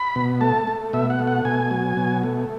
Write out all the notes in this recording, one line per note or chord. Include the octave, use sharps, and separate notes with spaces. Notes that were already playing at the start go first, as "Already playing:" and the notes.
Already playing: B5
B2
A3 A5
A3
B2 E5
F#5
A3
F#5
B2 G#5
F#3
B2
A3